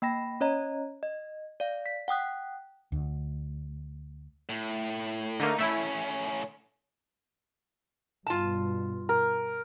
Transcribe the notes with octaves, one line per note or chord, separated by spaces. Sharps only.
A#3 G5 B5 A#6
C#4 C#5 D#5 A#5
D#5
D5 F5
B6
F#5 G5 D#6 F#6
D2
A2
D3 A3 A#3 D#4
A2 A3 C#4 E4
G2 B2 F4 A5
A#4